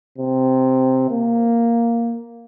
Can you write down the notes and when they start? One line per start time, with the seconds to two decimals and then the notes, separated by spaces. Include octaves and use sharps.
0.18 C3
1.10 A#3